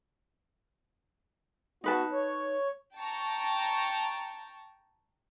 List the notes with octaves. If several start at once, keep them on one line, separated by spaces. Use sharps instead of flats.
B3 D#4 F#4 B4 A5
C#5
G5 A5 A#5 C#6